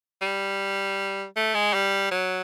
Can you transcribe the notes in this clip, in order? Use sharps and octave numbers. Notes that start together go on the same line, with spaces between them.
G3
A3
G#3
G3
F#3